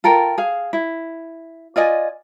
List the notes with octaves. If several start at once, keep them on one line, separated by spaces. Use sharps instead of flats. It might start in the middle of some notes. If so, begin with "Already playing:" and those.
F4 A4 A#4 G5
G#4 F5
E4
F4 D5 D#5 G#5